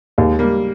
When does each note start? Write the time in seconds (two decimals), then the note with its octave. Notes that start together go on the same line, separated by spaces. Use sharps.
0.18 D#2 G#3
0.39 G3 A#3